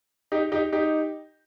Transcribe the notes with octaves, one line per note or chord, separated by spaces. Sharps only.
D#4 G4
D#4 G4
D#4 G4